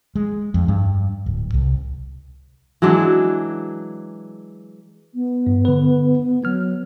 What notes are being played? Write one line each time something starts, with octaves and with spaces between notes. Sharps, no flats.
G#3
F2
G2
D1
C2
E3 F#3 G#3 D4
B3
G2
D3 B4
F#3 B3 F6